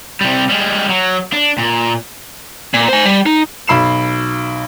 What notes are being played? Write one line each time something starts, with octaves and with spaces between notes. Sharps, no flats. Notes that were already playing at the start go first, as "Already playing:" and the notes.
C3 G3
G3 G#3
F#3
D4
A#2
A#2
C5 G#5
G3
D#4
B1 B5 C7 E7